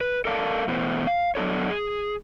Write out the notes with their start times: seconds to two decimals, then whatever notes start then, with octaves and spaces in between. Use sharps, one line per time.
0.01 B4
0.25 A4 A#4 D5 F5 G5 A5
0.68 B2 E3 A3 B3 C5
1.07 F5
1.35 F#3 B3 D4 A4 C#5
1.70 G#4